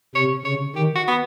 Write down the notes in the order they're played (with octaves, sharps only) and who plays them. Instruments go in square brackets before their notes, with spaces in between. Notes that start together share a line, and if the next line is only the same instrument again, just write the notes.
[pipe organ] C3 [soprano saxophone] C#5
[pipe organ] C#3 [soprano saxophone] C#5
[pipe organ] D#3 [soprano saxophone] G4
[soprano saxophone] F#4
B3